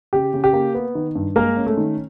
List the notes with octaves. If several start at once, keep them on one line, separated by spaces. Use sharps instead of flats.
C#3 G4
C#3
G4
A#3
B3
D#3
G2
G#3 A#3 A#4
C#4
A3 A4
D#3